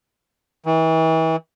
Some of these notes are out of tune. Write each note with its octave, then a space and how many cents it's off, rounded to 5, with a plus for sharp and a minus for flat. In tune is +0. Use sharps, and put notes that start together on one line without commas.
E3 -35